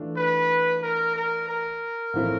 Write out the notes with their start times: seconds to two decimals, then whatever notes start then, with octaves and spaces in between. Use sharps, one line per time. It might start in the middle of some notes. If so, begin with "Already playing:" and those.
Already playing: E3 A3 D4 F4
0.16 B4
0.83 A#4
1.16 A#4
1.48 A#4
2.14 A2 F3 A3 C4 E4